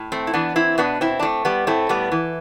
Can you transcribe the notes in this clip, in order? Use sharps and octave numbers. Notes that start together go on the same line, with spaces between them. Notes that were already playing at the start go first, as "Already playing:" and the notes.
Already playing: A2
A3 C4
E4
E3 B3 D4
C4 E4
B2 B3 D4
C4 E4
D4
A3 C4
G3 B3
A2 A3 C4
G3 B3
E3